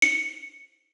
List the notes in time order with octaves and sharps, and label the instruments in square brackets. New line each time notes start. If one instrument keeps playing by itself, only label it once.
[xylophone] C#7